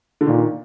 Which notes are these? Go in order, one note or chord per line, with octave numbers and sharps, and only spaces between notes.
D3
A#2 D#3